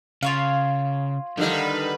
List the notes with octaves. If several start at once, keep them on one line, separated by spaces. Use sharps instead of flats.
C#3 F4 C#5 F5
D3 D#3 F3 G3
B4